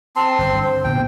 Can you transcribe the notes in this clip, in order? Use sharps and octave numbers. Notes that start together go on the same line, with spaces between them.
C4 A5 C6
G1 C5
D3
D2 A#2 B3 G5